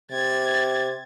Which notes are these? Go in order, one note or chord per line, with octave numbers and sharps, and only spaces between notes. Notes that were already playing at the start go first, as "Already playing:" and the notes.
C3 G#6 A6